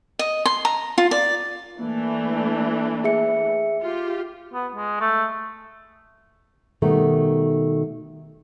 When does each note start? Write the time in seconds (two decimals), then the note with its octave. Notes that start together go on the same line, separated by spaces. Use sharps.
0.19 D#5
0.46 C6
0.65 A#5
0.98 F4
1.11 D5
1.80 E3 A3 A#3 D4
3.04 G#4 E5 C#7
3.82 F4 G4
4.54 B3
4.75 G#3
5.01 A3
6.82 B2 D#3 G3 A3